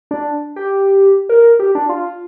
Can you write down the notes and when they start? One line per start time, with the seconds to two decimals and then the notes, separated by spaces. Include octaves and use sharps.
0.11 D4
0.56 G4
1.29 A#4
1.60 G4
1.75 D4
1.89 F4